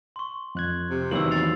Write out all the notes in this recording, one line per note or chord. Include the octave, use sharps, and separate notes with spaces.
C6 C#6
F2 F#6 G#6
C3
E2 D#3 E3 F#3 A#3 E6 F#7
A6 C7 F7